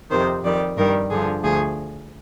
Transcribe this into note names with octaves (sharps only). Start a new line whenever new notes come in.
F2 C3 D#3 C5
F2 D#3 G3 D5
G2 D#3 G3 A#4
G2 D3 F3 G#4
D2 F3 G#4